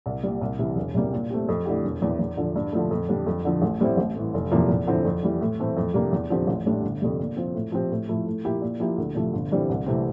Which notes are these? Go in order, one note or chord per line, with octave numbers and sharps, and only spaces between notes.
C2
A#2 G3
C2
C3 E3
E1
E2 C3 G3 A#3
A#2
A3 C4 G4
F2
D3 A3 E4 G4
E1
E2 E3
E2
D3 F3
G2
D3 F3 A3
F2
D3 G3 D4
F2
D3 F3
A1
A2 G3 C4 E4
A1
A2 E3
F1
E2 C3 F3 A#3
E2
D3 F3 C4 E4
F2
E3 G3
A2
E3 A3 C4
F2
C3 G3 A#3 D4
E2
D3 F3 C4 G4
A1
A2 G3 D4
G1
F2 C3 G3
A#2
F3 C4 F4
A2
F3 C4 G4
A2
F3 A3 E4
A2
F3 A#3 E4 G4
A#2
F3 A#3 E4 G4
D2
C3 F3 A3
G1
G2 E3 G3 C4
C2
C3 E3 A3 C4